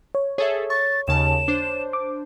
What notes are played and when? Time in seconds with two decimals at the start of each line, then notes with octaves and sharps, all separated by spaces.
0.15 C#5
0.38 G#4 A4 C#5 E5
0.70 C#6 A6
1.08 D#2 C#3 A5 E7
1.48 D4 C5
1.93 D6